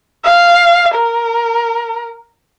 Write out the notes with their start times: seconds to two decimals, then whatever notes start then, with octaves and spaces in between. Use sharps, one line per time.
0.25 F5
0.95 A#4